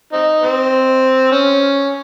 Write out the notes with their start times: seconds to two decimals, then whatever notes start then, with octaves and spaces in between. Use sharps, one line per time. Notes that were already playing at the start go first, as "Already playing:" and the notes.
0.13 C4 D#4
0.43 C4
1.32 C#4